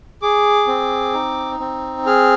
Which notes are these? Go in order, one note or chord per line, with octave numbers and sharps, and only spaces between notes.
G#4 D6
C4
D#4
C4
G#4 F6